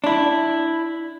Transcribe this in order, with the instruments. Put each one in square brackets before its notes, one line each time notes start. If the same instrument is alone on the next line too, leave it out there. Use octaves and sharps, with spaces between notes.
[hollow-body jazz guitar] D4 E4